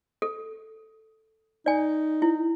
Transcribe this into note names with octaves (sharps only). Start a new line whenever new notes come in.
A4
D#4 D5 G#5
E4